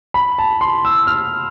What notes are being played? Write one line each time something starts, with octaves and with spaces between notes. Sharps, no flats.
B5
A5
C6
E6
F6